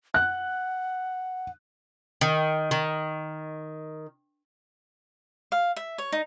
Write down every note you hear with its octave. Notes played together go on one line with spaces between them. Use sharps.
F#5 F#6
D#3
D#3
F5
E5
C#5
D#4